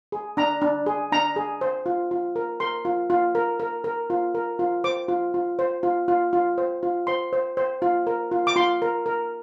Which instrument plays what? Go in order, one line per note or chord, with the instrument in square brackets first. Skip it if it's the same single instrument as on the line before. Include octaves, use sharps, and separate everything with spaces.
[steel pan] G#4
D4 A#5
D4
G#4
D4 A#5
G#4
C5
F4
F4
A#4
A#4 C6
F4
F4
A#4
A#4
A#4
F4
A#4
F4
C5 D6
F4
F4
C5
F4
F4
F4
C5
F4
C5 C6
C5
C5
F4
A#4
F4
D6
F4 C6
A#4
A#4